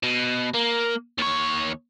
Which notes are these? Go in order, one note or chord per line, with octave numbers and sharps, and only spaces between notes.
B2
A#3
D#2 C#5